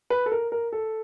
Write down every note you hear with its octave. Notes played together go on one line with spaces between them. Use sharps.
B4
A4
A#4
A#4
A4